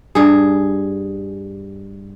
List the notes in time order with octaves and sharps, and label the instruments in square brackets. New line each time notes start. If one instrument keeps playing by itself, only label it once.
[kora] G2 G#4